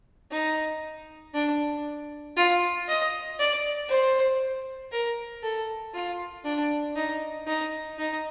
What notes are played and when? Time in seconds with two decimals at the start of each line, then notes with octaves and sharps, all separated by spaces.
0.31 D#4
1.34 D4
2.37 F4
2.88 D#5
3.39 D5
3.89 C5
4.92 A#4
5.43 A4
5.94 F4
6.45 D4
6.95 D#4
7.47 D#4
7.99 D#4